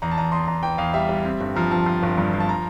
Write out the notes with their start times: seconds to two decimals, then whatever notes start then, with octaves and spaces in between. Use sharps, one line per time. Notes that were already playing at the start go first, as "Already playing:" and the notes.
0.02 E2 A#5
0.11 A5
0.17 E2 A#5
0.32 E2 C6
0.47 E2 A#5
0.63 E3 G5
0.78 E2 F5
0.94 G3 E5
1.09 G3
1.25 C4
1.41 G1
1.56 F3 A#5
1.71 F3 A5
1.86 F3
2.03 G1
2.18 G2
2.34 F3
2.40 A5
2.49 A#5